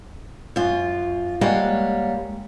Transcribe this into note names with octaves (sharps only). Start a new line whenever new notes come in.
F#2 F4
G3 G#3 A#3 C#5 F5 F#5